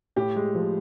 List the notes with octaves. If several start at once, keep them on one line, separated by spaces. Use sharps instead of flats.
A2 G4
G#3
F3